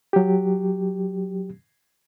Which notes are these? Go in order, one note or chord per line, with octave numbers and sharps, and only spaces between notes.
F#3 G4